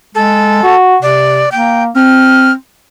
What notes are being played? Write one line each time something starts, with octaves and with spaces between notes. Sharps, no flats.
G#3 A4
F#4
C3 D5
A#3 G5
C4 F6